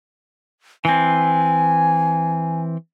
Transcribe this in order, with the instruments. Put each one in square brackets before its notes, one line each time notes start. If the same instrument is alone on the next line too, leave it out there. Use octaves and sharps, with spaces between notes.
[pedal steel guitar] E3 C4 [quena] G#5